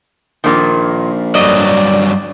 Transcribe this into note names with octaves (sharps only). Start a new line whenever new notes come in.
A#1 A#2 D#3
G2 F#3 D5 D#5